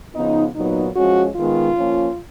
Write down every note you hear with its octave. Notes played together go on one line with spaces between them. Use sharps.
C#3 F3 B3 D#4
A#2 F#3 B3 D#4
F3 G#3 C#4 F#4
D#3 G#3 B3 F4
F3 A#3 C#4